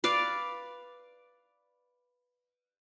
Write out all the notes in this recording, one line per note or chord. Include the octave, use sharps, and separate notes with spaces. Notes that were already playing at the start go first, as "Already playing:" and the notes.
B4 D5 F5